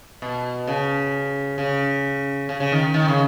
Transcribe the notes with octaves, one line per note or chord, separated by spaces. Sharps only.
B2
C#3
C#3
C#3
C#3
D#3
D#3
C#3